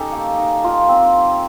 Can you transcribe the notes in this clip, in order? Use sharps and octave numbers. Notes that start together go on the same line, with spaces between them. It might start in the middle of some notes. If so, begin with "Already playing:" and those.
Already playing: C#4 D#4 G4 A4
A#3
D#4
F4
C4